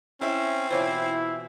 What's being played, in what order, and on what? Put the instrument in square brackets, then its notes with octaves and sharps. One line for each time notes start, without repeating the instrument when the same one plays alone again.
[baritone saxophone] C4 [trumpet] C#4 [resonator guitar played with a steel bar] E4 E5
[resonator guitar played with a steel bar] B2 E3 F4 [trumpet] E4 [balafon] C5 C#5